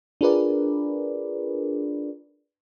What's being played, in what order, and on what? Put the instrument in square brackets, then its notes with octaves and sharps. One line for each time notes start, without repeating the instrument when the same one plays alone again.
[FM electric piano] D4 F4 G#4 A#4 B4 D5